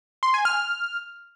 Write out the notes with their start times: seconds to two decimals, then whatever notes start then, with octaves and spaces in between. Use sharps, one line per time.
0.23 C6
0.34 G#5
0.45 F6